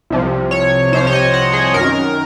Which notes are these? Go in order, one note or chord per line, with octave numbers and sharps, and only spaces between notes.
C2 C3 F3
C#5
C2 C3 F3 C5
C#5
D#5
F#5
G#4
F#2 D#3 A#4